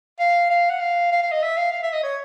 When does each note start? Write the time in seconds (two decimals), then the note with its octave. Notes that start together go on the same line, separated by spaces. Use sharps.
0.19 F5
0.50 F5
0.70 F#5
0.80 F5
1.12 F5
1.22 F5
1.32 D#5
1.42 E5
1.57 F5
1.72 F5
1.83 E5
1.93 D#5
2.03 C#5